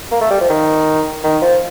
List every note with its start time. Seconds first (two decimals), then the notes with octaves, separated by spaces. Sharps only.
0.12 A#3
0.21 A3
0.31 G3
0.41 F3
0.50 D#3
1.24 D#3
1.42 F3